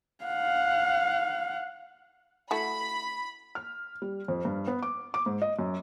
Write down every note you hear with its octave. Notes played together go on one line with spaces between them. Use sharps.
F5 F#5
A3 E4 F#4 B5
F6
G3
F2
G2
B3
D6
D6
G#2
D#5
F#2